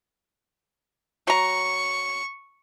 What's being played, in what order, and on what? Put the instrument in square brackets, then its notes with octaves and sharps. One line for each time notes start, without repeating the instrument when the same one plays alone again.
[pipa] F#3 A#5 [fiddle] C#6